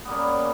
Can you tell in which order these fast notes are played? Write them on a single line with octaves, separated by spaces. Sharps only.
B3 G3 A#3 C#3